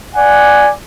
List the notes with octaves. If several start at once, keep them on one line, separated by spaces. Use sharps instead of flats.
D5 F#5 G#5